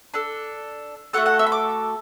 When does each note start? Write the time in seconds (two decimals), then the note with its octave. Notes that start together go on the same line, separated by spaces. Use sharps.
0.14 D4 A4
1.13 A3 F#4 A4 F#5
1.26 F#5
1.39 E5
1.46 B5
1.52 D6